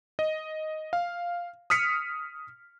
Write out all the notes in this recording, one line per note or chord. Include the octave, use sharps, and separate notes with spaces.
D#5
F5
D#6 F6 B6 C#7